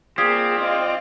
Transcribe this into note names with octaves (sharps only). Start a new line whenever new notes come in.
A#3 C4 F4 G#4 D5 D#6 G#6 B6
D#5 F5